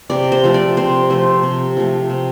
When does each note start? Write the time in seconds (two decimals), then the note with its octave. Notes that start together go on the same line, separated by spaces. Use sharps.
0.10 C3 D5
0.32 C5
0.44 F3 A3
0.54 D5
0.77 C3 C5
1.10 F3 A3 C5
1.43 C3
1.77 F3 A3
2.10 C3